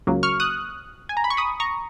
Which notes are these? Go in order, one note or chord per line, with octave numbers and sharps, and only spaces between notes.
C#2 C#3 F#3 A#3
C#6 F6
D#6 F#6
G#5
A#5
B5
C#6
B5 D#6
A#5 C#6